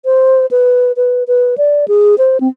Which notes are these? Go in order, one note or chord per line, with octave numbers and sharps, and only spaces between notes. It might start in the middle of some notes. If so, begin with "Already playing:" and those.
C5
B4
B4
B4
D5
G#4
C5
C4